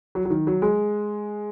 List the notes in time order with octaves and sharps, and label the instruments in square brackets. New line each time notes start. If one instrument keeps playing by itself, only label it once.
[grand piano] F#3
F#3
D#3
F#3
G#3